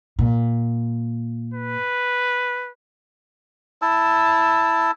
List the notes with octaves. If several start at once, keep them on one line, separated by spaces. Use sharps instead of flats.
A#2
B4
E4 A5 E6